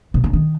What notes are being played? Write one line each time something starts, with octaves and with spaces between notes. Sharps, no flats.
B2
C#3
D#3